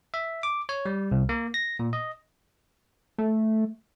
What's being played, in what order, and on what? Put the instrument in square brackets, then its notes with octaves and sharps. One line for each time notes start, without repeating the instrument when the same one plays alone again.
[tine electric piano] E5
D6
C#5
G3
C2
A#3
A#6
A#2
D#5
[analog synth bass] A3